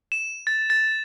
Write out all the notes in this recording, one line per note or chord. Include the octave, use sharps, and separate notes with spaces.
E7
A6
A6